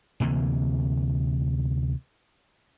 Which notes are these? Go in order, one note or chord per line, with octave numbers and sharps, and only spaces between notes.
D2 C3 E3 A#3